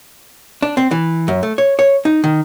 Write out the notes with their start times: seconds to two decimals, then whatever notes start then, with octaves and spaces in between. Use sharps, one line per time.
0.62 D4
0.77 C4
0.91 E3
1.28 F#2
1.43 A3
1.58 C#5
1.79 C#5
2.05 D#4
2.24 D#3